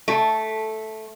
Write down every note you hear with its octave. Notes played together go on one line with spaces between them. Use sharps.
A3